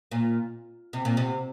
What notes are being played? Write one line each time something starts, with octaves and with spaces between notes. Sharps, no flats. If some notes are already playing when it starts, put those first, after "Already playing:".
A#2
C3
A#2
C3